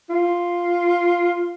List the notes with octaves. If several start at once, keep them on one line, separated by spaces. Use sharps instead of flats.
F4